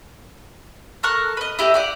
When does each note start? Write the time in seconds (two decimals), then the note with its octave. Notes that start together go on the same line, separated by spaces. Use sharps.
1.03 A4 A#4 C#6 F#6
1.37 B4 D#5
1.59 E4 G4 A4 D#5
1.74 G4 D5 F#5